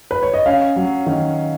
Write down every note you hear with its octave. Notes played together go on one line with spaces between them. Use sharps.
B4
C#5
D#5
C#4 F5
F#3
D#3